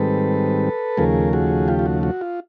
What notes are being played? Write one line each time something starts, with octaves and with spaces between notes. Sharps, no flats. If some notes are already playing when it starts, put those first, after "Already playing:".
Already playing: G#2 D#3 G3 C4 A4 B4
D#2 C#3 F3 A3 G#4 A#4
F#4 G#4
F4 G4
F4
F#4
F#4
F4